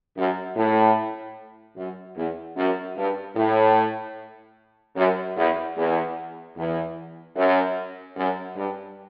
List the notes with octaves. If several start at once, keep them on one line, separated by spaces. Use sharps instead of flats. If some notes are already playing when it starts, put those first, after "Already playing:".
F#2
A2
F#2
E2
F#2
G2
A2
F#2
E2
E2
E2
F#2
F#2
G2